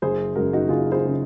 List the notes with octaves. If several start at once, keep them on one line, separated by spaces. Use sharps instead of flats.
F#1 G#4 C5
F#2 C#3 F#4 A#4
D#4 F#4
F#1 F4 G#4
G#4 C5
C#3